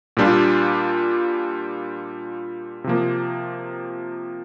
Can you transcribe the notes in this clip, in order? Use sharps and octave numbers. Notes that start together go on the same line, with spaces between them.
A#2 G3 D4 F4
C3 F3 A#3